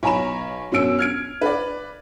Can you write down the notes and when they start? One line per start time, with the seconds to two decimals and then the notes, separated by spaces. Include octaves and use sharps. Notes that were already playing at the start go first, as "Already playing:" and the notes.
0.03 B1 C#5 G#5 A#5 B5 E7
0.72 F#2 B2 C#4 E6 D7
0.99 F6 G#6 D7
1.41 B4 D5